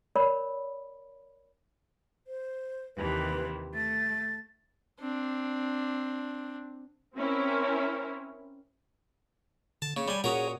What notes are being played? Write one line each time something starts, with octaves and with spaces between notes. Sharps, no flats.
A#4 C#5 D5 B5
C5
D#2 C3 E3 B4
A3 A6
C4 D4
C4 C#4 E4 A#4
D3 A5
C#3 A#3 C#5
G3 D5 G#5 B5
A#2 C#4 F#4 G#4 A#4 C#5 F#5 D#6